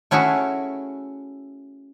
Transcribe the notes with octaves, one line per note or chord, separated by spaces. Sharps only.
A3 C#4 E4 F#4 G#4